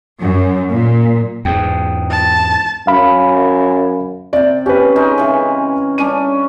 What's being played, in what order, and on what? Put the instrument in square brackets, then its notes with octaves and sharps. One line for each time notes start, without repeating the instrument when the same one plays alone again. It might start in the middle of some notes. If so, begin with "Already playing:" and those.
[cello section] F#2
A#2
[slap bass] E2 G#2 [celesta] G5
[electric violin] A5
[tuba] F#2 [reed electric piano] F5 B5
[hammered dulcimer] C3 G5 [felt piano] D5
[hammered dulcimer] C#4 [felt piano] G4 B4
[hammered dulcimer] G#3 D#4 A#4
C#3 E3
[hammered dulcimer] G3 C#4 D4 [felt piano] D#7